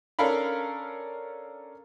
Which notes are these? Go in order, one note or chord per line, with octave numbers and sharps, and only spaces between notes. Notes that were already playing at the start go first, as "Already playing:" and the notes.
C#4 D4 A4 A#4 F5 B5